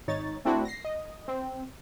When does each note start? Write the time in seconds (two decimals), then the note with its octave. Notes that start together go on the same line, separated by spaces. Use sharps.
0.08 G#1 D#4 C#5 A6
0.45 A3 C4 D4 E4 F#4
0.65 A#6 C7
0.85 D#5
1.28 C4